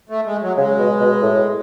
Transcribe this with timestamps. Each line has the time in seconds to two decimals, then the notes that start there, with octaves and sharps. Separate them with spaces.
0.09 A3
0.26 G#3
0.42 F#3
0.58 C#3 G#3
0.78 B2
1.00 B2
1.22 A2